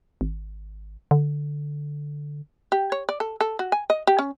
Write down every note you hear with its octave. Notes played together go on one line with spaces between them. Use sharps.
G#1
D3
G4
C#5
D5
A4
A4
F#4
G#5
D#5
G4
C#4